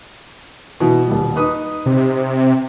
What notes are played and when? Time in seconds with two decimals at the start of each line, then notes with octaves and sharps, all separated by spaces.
0.80 B2 E3
1.08 D#1 G3
1.36 D#4 B4 D#6
1.86 C3